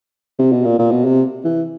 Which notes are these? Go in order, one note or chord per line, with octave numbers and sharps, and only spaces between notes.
C3
B2
A#2
A#2
B2
C3
E3